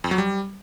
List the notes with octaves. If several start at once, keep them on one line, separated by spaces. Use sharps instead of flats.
F2
F#3
G3